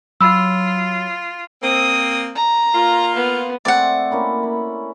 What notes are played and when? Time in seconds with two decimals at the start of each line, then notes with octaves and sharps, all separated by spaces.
0.21 F#3 F4 B5 E6
1.63 A#3 C4 D#6
2.35 A#5
2.75 A#3 F4
3.15 B3
3.65 A3 C4 C5 D5 F#5
4.11 A#3 C#4 E4
4.43 B5